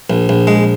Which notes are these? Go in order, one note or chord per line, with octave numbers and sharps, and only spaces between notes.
A#1
A#1
G#3